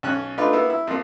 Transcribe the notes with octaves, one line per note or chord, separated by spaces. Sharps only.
B1 C#4 F#6
A3 D4 D#4 F4 B4
A#3 B3 E4
E4
F2 A#3